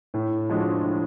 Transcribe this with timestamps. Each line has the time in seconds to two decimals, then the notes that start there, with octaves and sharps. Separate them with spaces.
0.14 A2
0.49 F3 G#3 D4 F#4
0.84 A2